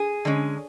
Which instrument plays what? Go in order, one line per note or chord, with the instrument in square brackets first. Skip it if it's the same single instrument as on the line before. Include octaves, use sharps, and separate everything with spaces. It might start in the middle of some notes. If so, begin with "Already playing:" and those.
Already playing: [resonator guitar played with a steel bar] G#4
D3 G#3 C#4